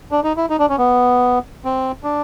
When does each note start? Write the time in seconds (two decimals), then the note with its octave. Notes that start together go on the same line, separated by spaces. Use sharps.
0.11 D4
0.24 D#4
0.37 E4
0.50 D#4
0.59 D4
0.69 C#4
0.78 B3
1.65 C4
2.04 D4